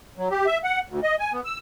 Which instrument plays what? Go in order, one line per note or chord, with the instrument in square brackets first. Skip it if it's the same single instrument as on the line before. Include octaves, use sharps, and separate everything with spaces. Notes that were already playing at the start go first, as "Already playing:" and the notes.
[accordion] F#3
G4
E5
F#5
D2
D#5
G#5
B3
E6